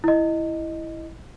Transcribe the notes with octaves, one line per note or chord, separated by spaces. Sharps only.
E4 D#5